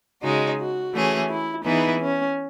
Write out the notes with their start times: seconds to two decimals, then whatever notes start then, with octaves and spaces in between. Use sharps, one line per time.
0.22 C#3 G#3 D#4 F#4
0.58 F#4
0.93 E3 A3 C#4 G#4
1.29 E4
1.65 E3 B3 D#4 E4 G#4
2.01 C#4